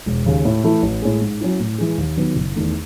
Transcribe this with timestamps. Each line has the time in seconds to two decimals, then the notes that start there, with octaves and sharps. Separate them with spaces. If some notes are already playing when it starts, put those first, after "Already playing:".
0.06 E1
0.26 D#2 C#3
0.45 A2
0.64 E3 A3 E4
0.83 A1
1.02 A2 G#3
1.21 G#2
1.41 F#3 C#4 E4
1.60 A2
1.78 E3 G#3
1.98 D#2
2.17 D#3 F#3 B3
2.36 F#1
2.56 E2 D#3 A3